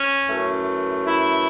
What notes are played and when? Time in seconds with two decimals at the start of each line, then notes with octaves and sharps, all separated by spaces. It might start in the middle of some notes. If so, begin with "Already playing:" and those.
Already playing: C#4
0.25 F#2 E3 A3
1.08 E4